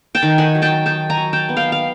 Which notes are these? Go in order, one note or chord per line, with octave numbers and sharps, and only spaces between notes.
G5 A5
D#3
F#5 G#5
F#3
G5 A5
D#3 G5 A5
G#5 A#5
F#3
G5 A5
B3
F5 G5
F5